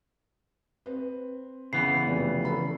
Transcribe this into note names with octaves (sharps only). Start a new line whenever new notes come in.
C4 B4
C#3 E3 B3 C7
F1 F2
C#4 A4 B5